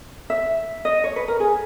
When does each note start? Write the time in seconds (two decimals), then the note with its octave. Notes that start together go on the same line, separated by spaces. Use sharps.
0.30 E5
0.85 D#5
1.04 C#5
1.16 B4
1.28 A#4
1.40 G#4